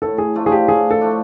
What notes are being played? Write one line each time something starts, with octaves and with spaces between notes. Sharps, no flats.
A2 A4
G#4
F3 A3 D4
G#4
G4
A2 G#4
A4
F3 A3 D4